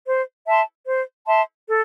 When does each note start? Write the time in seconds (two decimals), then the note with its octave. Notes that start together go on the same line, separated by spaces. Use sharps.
0.07 C5
0.47 E5 A5 C6
0.86 C5
1.27 E5 A5 C6
1.68 A4